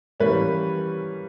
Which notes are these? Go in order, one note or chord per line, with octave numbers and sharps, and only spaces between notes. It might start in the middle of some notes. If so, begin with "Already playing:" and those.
E3 G3 A#3 C#4 B4